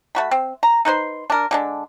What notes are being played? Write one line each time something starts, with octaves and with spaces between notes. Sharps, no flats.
A3 F#4 B5
C4
A#5
D#4 B4 C5 C6
D4 A#4
D3 G#3 D4